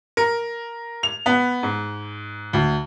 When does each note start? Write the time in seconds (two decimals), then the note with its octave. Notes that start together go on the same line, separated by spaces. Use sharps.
0.17 A#4
1.03 F7
1.26 B3
1.63 G#2
2.53 D2